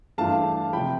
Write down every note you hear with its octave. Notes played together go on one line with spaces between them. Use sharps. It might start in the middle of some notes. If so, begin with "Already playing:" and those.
G2 E3 A3 D4 F4 F5 A5
C3 F3 G5 B5